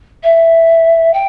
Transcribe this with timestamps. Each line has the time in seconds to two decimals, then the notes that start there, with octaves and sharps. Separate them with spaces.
0.23 E5
1.13 G5